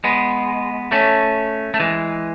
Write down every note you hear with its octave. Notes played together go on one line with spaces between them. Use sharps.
G#3 B3
A3 C#4
A3
E3 G#3